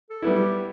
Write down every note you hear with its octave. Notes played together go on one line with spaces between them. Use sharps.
A4
G3 B3 E4
G4